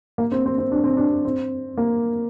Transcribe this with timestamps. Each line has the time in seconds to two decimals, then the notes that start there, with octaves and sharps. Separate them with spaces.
0.18 A#3
0.32 C4
0.46 C4
0.58 C4
0.72 D4
0.84 C4
0.97 D4
1.25 C4
1.77 A#3